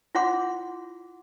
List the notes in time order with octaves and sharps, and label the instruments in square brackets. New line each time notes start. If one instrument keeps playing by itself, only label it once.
[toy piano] E4 F4 C#5 F#5 C6 D6